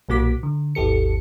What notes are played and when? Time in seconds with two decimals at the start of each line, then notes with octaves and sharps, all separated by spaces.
0.09 B1 A#2 A#3 F#4 D6 B6
0.43 D3
0.75 G#1 D#2 G4 A4 C#7